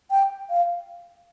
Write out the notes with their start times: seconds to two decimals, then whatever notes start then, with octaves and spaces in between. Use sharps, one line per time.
0.11 G5
0.50 F5